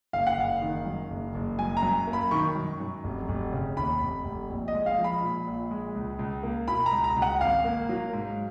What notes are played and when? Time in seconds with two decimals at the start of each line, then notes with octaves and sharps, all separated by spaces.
0.13 F#1 F5
0.27 F#5
0.37 F#1 F5
0.62 D#3
0.86 F#2
1.10 F#1
1.34 F#1
1.59 F#2 G#5
1.77 A#5
1.83 F#2
2.07 A#3
2.13 B5
2.31 D#3 C#6
2.56 F#2
2.80 F#2
3.04 F1
3.29 F1
3.53 C#3
3.77 D#2 B5
4.01 F1
4.25 F1
4.50 A#1
4.68 D#5
4.74 G#3
4.86 F5
4.98 F3
5.04 B5
5.22 A#2
5.47 A#1
5.71 G#3
5.95 C#2
6.19 C#2
6.43 A#3
6.68 B2 B5
6.86 A#5
6.92 C#2
7.04 A#5
7.16 C#2
7.22 F#5
7.41 G#1 F5
7.65 A#3
7.89 F#3
8.13 G#2